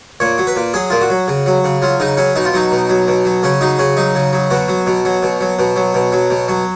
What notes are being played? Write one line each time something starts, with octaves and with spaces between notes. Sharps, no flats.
A#2 C#5
F#3
B4
A#2
F#3 G#4
A#2 F4
F#4
F#3
C#3
F#3
C#3
F#3 F4
C#3 D#4
F#3 C#4
B2 D#4
F4
F#3 D#4
B2
F#3
B2
F#3
C#3 C#4
F#3 D#4
C#3 C#4
F#3 D#4
C#3
F#3
B2 F#4
F#3
B2
F#3
B2
F#3
B2
F#3
B2
F#3
B2
F#3